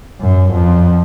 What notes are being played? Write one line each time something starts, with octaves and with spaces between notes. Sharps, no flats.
F#2
F2